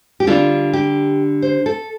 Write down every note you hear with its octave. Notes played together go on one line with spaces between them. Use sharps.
G4
D3 G3 D4 F4
G4
C5
A4